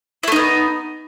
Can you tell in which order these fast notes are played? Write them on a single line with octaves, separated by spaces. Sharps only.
E4 A3 D#4 B3